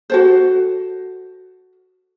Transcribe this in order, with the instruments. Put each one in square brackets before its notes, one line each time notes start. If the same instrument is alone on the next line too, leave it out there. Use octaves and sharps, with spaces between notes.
[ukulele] F#4 A4 C5